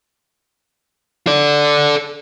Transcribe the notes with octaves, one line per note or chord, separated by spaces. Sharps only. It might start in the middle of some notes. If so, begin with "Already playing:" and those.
A4 D5